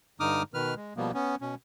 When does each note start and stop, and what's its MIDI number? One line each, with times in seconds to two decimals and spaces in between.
0.20 0.43 43
0.20 0.43 50
0.20 0.43 63
0.20 0.43 86
0.20 0.43 87
0.20 0.43 89
0.54 0.74 47
0.54 0.74 51
0.54 0.74 71
0.54 0.74 89
0.76 0.93 56
0.97 1.11 47
0.97 1.11 53
0.97 1.11 55
0.97 1.11 58
0.97 1.11 59
1.14 1.35 59
1.14 1.35 61
1.41 1.55 47
1.41 1.55 61